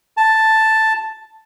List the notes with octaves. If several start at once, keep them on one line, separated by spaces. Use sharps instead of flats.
A5